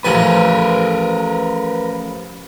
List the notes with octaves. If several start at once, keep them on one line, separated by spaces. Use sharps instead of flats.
A1 F3 A#4 B4 G#5